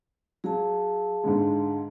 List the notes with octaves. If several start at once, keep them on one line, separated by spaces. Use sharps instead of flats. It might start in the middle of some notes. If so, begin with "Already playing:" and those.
F#3 G#4 F5 A5
G#2 D3 G#3